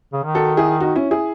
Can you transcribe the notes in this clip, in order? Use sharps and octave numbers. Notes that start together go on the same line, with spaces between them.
C#3
D#3
F#4 A4
E4 G#4
D#4 F#4
C#4 E4
E4 G#4